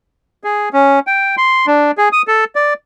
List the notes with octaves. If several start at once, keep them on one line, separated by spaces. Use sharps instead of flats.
G#4
C#4
G5
C6
D4
G#4
D#6
A4
D5